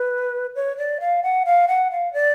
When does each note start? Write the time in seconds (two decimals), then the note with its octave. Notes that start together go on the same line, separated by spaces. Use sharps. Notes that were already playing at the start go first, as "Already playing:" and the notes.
Already playing: B4
0.55 C#5
0.78 D5
1.00 F5
1.23 F#5
1.45 F5
1.68 F#5
1.91 F5
2.13 D5